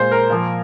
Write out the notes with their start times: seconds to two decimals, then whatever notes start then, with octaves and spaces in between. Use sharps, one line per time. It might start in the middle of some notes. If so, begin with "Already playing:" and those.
Already playing: A#2 G#3 C5
0.11 A#4
0.30 A#2 F3 A#3